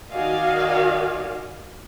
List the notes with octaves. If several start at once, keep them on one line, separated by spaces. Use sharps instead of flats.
D#3 F#4 D5 D#5 F5 G#5